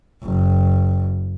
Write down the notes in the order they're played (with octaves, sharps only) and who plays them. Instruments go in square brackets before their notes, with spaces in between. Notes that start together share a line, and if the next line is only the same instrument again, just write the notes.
[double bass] F#1